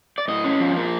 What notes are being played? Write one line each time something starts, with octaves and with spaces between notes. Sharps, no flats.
D5
A2 D#5
C#4
F3
A#3